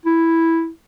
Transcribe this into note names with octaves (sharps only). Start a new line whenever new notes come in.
E4